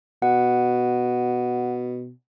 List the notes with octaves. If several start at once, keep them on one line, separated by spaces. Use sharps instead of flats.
B2 F#5